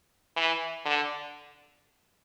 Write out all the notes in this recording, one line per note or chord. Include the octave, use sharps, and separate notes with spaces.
E3
D3